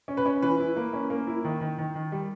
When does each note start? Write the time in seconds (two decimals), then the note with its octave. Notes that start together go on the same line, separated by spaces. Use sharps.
0.08 C#4
0.17 B4
0.26 C#4
0.42 E3 B4
0.60 E4
0.77 A#3
0.93 C#4
1.10 A#3
1.27 E4
1.45 D#3
1.61 D#3
1.78 D#3
1.95 D#3
2.12 G3